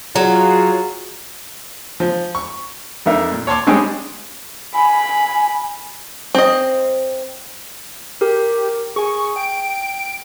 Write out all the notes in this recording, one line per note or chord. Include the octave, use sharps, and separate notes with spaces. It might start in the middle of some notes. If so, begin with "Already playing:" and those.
F#3 F4 F#4 G#4
F3
C#6
F2 D4 D#4 A#4 E5
A#2
C#5 A5 C6 D6
G3 G#3 C#4 D4 G5 D#6
G#5 B5
C4 D#5
G4 A#4
G#4 G#5 C#6
G5 D7